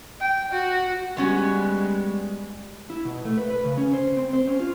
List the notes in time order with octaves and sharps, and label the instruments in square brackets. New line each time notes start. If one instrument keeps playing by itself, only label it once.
[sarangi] G5
F#4
[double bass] G3 G#3 [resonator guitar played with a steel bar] B3 C#4 F#4
[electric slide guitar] E4
B2
A3
B4
B4
C#3
C#4
C5
C4
C5
C#4
F4